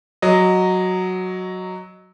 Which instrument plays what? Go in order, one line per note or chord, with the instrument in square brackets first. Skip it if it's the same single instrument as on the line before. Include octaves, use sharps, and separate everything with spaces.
[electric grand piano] F#3 D#5